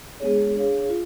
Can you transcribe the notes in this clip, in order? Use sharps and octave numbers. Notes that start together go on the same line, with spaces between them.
G#3 B3 D4 G#4 C#5
D4 G#4 C#5 F5
F4